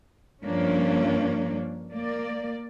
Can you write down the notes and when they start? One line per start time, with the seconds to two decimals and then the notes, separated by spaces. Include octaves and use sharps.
0.43 G2 F3 A#3 C#4 D4
1.93 A#3 D5